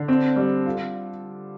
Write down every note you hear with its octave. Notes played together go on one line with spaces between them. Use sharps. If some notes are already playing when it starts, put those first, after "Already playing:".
Already playing: D3
C4
G3
F4